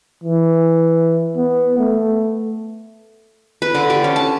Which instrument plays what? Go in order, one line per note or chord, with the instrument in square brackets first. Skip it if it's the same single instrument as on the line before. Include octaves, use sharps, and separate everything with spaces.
[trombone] E3
B3
A3
[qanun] B4
D3
G4
C#4
A5